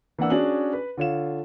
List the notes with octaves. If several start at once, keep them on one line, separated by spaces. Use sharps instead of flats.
E3 A#3 D4 F#5 E6
C#4 D4 F#4 G#4 F#7
B4
D3 F4 C#5 F5 E7